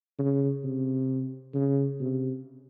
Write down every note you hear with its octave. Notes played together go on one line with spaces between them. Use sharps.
C#3
C3
C#3
C3